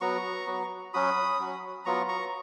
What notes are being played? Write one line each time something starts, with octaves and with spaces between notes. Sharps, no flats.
F#3 B3 F#4 A#5 C#6
F#3 B3 F#4
F#3 C#4 F#4 B5 D#6
F#3 C#4 F#4
F#3 B3 F4 A#5 C#6
A#5 C#6